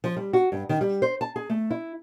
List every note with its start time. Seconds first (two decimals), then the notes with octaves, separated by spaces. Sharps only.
0.04 F3
0.17 G3
0.33 F#4
0.52 G2
0.69 D#3
0.81 G3
1.02 C5
1.21 A5
1.36 G#4
1.50 A3
1.71 E4